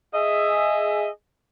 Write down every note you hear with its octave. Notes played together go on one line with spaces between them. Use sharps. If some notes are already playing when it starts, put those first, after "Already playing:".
G#4 D#5 E5